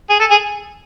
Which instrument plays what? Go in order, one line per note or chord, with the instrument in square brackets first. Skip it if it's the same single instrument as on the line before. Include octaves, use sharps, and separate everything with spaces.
[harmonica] G#4
A4
G#4